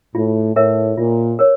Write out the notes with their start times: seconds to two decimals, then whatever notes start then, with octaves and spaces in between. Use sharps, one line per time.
0.15 A2 F4
0.56 A2 A#4 C#5 E5
0.97 A#2 F4
1.39 A#4 C#5